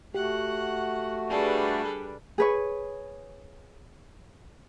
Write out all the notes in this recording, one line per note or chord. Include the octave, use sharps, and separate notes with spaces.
A3 F#4 G4 F#5
G3 D4 G#4 A4 B4
G#4 B4 C#5